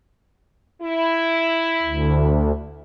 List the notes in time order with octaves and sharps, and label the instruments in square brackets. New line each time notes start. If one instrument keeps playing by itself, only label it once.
[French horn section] E4
[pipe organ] D2